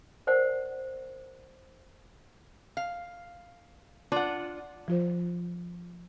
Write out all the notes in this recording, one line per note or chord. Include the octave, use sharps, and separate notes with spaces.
A#4 C5 D5 F#5
F5
D4 F4 F#5
F3 F4 C5